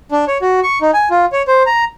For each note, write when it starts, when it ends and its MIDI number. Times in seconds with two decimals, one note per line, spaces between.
0.11 0.25 62
0.28 0.38 73
0.42 0.60 66
0.63 0.79 85
0.81 0.91 63
0.93 1.09 80
1.10 1.25 65
1.32 1.42 73
1.48 1.63 72
1.66 1.84 82